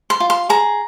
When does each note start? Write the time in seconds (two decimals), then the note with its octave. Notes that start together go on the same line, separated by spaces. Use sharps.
0.10 C6
0.20 F4
0.30 C6
0.49 G#4 A#5